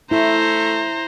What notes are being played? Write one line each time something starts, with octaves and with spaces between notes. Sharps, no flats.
A3 E4 C5 A#5